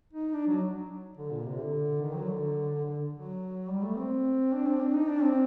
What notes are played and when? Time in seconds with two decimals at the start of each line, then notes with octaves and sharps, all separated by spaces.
0.13 D#4
0.33 D4
0.47 F#3
1.17 D3
1.31 A#2
1.45 C3
1.60 D3
2.01 D#3
2.15 F#3
2.29 D3
2.85 D3
3.13 F#3
3.68 G3
3.83 A3
3.97 C4
4.52 D4
4.67 C4
4.80 D4
4.94 D#4
5.08 D4
5.23 C4